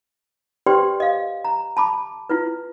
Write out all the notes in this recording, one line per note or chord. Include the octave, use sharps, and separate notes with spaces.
G4 B4 C5 D5 G5 C6
D#5 F5
A#5
A5 B5 D6
E4 F4 B4